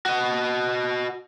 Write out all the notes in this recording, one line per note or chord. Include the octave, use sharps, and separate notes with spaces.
F#4 D#5